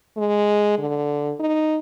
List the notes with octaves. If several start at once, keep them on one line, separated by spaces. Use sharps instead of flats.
G#3
D3
D#4